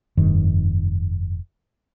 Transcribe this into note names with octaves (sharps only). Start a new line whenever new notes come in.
F1 G2 D#3